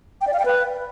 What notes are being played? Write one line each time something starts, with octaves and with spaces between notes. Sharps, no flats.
G5
D5
F5
G5
B4